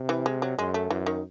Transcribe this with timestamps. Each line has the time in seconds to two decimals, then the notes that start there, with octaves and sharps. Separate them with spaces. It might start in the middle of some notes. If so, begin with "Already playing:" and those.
Already playing: C3
0.09 E3
0.26 G#3
0.42 F#3
0.58 F#2 G#3
0.74 A3
0.90 F#2 E3
1.06 D#3